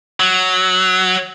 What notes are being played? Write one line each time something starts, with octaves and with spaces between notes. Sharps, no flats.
F#3